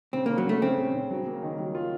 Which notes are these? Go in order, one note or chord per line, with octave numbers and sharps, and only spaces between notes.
C#3 C4
C#3 A#3
F#3
C#3 A3
C#3 C4
C#3
C#3
F#3
A#3
D#3
F#3
F4